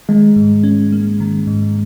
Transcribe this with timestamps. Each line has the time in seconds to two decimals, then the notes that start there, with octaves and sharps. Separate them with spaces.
0.09 D#3 G#3
0.36 G#2
0.63 C#4
0.92 A#3
1.20 D#3
1.47 G#2